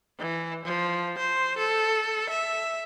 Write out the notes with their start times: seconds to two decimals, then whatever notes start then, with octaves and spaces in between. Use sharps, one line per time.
0.19 E3
0.65 F3
1.18 C5
1.58 A4
2.30 E5